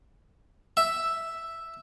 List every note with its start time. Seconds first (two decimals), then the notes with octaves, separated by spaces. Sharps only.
0.77 E5